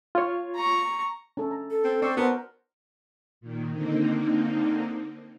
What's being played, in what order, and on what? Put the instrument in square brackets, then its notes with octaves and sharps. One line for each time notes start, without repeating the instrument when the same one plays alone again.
[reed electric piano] F4 C#5
[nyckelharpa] A#5 C#6
[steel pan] C#4 A4
A#5
[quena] A4
[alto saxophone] C4
[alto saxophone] C4 [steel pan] D5 C#6 E6
[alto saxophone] B3 [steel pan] F#4 A#4 C5 [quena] A5
[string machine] A#2 D#3
D3 A#3 C4 D#4